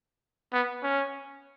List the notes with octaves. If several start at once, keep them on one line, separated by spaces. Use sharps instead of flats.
B3
C#4